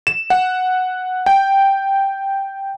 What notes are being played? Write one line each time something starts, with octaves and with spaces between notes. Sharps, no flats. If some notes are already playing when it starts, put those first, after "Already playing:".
E7
F#5
G5